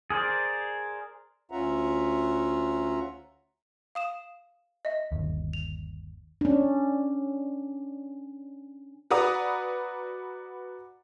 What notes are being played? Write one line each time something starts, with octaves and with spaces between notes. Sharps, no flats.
G#4 A#4 C5 D5
D2 C#4 F4 E5 F#5 A#5
F5 D#6 E7
D#5 E5
G1 D#2
F7
C#4 D4
F#4 B4 D5 F#5 A#5 D#6